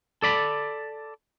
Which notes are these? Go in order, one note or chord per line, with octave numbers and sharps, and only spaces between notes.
A4 D5 B5